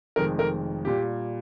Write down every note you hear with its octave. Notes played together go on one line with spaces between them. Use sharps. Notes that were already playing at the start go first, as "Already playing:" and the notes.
F1 F2 D#3 G#3 A#4
A#4
A#2 G3 G4